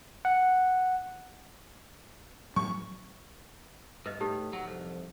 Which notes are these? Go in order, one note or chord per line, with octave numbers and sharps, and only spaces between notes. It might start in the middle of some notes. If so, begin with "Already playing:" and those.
F#5
A2 F#3 G3 C#6
G2 B4 D#5
A2 D#4 G4 A4
F#3
C2 F2